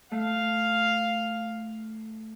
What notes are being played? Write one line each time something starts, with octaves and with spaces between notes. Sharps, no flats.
A3 F5